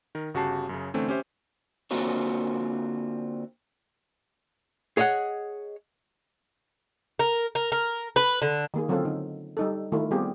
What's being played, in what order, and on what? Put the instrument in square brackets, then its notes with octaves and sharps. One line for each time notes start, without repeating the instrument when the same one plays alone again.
[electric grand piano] D#3 A#4
G1 C#3 F#4 G4 A5 C7
F#2 C#3
D3 E3 A3 C4 C#4
C#4 G4 C5 E5
[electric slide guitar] D3 A#3 C4 F4 F#4 C#5
[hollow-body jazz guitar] G#4 C#5 D#5 E5 F#5
[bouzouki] A#4
A#4
A#4
B4
D3
[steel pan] D#3 A#3 G#4
D3 F#3 C4 C#4 F4 A4
D3 D#4
G3 D#4 A4
D#3 A3 E4 F4 A#4
G3 B3 C4 F4 G4 G#4